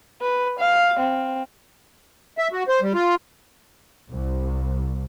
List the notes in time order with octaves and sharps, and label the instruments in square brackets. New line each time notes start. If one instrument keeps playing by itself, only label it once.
[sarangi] B4
F5
C4
[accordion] E5
F#4
C5
G3
F4
[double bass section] C2